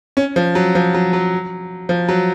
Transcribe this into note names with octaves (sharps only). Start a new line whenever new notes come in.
C#4
F3
F#3
F3
F#3
F#3
F3
F#3